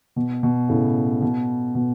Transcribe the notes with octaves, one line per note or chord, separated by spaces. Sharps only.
B2
B2
A2 C#3
B2
B2